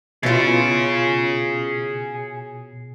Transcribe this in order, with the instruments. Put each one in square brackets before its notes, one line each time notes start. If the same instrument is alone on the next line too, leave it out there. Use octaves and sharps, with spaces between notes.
[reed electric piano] B2 A6 [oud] E4 F4 [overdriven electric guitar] G#4 C#5